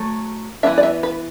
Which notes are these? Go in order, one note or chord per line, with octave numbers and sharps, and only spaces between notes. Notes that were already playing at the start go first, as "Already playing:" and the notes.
Already playing: F#3 A3
E3 B3 D4 E5
D5
E5
B4